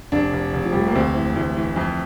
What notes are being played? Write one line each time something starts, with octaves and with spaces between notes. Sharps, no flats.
F1 D4
F1
F1
F3
F1 G3
A3
A#3
D2 C4
E3
D2 E3
E3
F2